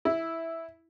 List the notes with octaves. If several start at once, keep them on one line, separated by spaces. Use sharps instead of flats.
E4